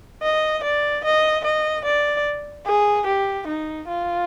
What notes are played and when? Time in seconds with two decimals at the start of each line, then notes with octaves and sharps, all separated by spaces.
0.23 D#5
0.63 D5
1.04 D#5
1.44 D#5
1.85 D5
2.66 G#4
3.06 G4
3.47 D#4
3.88 F4